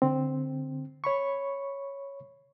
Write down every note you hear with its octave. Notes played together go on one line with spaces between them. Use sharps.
D3 C4
C#5 B5 C#6